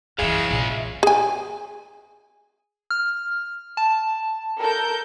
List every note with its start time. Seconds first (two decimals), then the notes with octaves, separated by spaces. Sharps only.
0.19 F#2 C#3 E3 G#3 G#4 E5 F5
0.51 A#1
1.03 G#4 G#5
2.91 F6
3.77 A5
4.59 A4 A#4 G6